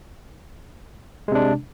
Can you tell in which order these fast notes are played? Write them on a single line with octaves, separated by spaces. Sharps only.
G#3 C3 D4